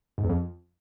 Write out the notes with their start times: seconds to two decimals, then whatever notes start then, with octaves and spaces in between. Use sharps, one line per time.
0.18 G#2
0.24 E2
0.29 F2